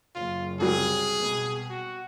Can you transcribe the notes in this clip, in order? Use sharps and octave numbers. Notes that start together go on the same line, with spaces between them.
F#1 F4
C2 F#3 G#4
B2
F#4